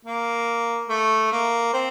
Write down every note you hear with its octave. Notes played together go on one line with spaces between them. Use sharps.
A#3
A3
A#3
C4